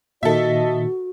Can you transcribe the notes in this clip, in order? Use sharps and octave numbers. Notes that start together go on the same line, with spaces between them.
A#2 D#3 F#4 A4 D#5 E5